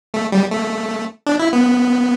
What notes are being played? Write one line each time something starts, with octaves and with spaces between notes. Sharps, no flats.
A3
G3
A3
D4
E4
B3